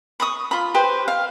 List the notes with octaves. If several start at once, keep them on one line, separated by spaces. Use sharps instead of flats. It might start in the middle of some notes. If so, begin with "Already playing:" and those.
B5 C#6 D#6
F4 B5
G4 B4 C5
F5